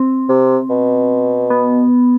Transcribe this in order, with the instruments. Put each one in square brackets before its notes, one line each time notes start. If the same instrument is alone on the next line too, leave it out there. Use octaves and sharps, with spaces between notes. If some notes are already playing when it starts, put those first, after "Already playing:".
Already playing: [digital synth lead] C4
[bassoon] C3
B2
[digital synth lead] B3